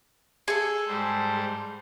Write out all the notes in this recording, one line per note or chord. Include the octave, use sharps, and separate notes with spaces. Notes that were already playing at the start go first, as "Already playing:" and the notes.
G#4 A4
G#2 G3 C5